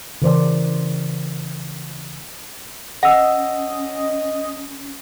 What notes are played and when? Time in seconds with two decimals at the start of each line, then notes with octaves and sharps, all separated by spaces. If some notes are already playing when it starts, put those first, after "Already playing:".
0.22 C#3 E3 A#4 C5 D5
3.03 C#4 D#5 F#5 E6